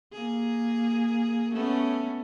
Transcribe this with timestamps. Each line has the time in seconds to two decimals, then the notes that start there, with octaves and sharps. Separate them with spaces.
0.13 A#3 G#4
1.53 A3 B3 C#4